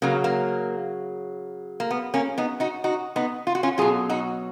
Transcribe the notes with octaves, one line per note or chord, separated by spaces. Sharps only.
C#3 F#3 A#3
A#3
A#3
B3
A#3 C#4
B3 D#4
D#4 F#4
D#4 F#4
B3 D#4
F4
F#4
C#4 F4
B2 F#3 F4 G#4
D#4 F#4